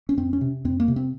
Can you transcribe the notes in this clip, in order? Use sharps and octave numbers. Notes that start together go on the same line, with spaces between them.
C#4
F2 C4
C#4
C3
F2 C4
A#3
C3
C4